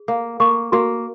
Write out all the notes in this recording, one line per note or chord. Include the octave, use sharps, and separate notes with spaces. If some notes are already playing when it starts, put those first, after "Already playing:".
Already playing: G#4
A#3 F5
A#3 C#6
A#3 F#4